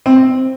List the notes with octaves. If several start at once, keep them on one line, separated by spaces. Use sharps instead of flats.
C4